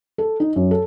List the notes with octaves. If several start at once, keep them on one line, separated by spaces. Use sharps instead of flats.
A4
D#4
F#2
A4